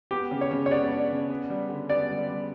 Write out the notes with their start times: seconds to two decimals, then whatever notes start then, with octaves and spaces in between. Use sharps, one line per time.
0.11 B3 G4
0.31 C#3
0.41 C#5
0.51 C#3
0.66 C#5
0.71 B3 D5
0.90 D4
1.10 C#3
1.30 B3
1.50 G3
1.69 D3
1.89 B3 D5
2.09 G3
2.29 G3